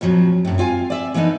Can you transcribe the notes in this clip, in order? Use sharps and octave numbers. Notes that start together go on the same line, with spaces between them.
F2 A#2 F3 F#3
F#2 A2
C4 F4 F5 G#5
D5 E5
E3 A#3 B3 D4 D#4